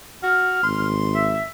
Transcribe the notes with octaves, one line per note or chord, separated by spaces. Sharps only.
F#4 F6
G#1 C6
E5